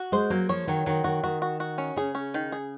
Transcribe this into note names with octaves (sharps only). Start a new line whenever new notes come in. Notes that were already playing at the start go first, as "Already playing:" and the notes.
Already playing: F#4
G#3 C5
F#3 A#3
F3 C#5
D#3 F#3
D#3 F#3
D#3 F#4
D#3 F#4
F#4
F#4
C#4
C#3 G#4
C#4
D#3
G#4